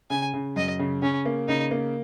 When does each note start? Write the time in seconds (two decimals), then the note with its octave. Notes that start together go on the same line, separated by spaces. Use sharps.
0.10 C#3 G#5
0.34 C#3
0.56 F#2 D#5
0.79 C#3
1.02 C#3 C#4
1.25 A#3
1.48 C#3 D#4
1.71 A#3